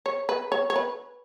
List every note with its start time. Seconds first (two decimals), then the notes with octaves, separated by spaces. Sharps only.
0.06 C#5
0.29 B4
0.52 C#5
0.70 C#5
0.76 B4